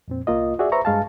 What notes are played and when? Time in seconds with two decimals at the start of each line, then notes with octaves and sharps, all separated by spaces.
0.08 F2 A#2 C4
0.27 C2 A#3 F4 D#5
0.59 F#4 G#4 D5 E5
0.72 B4 C5 E5 A#5 C#6
0.85 G2 G#3 F5 A5